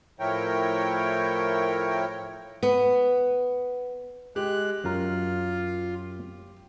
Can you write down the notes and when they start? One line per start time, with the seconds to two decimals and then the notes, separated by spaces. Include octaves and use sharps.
0.20 A2 F3 E4 A#4 C#5 G5
2.63 B3
4.36 G#3 G4 F#6
4.84 F#2 F4 A#4